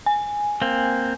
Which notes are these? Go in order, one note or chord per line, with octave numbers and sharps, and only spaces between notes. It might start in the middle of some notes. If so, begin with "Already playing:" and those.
G#5
A#3 C4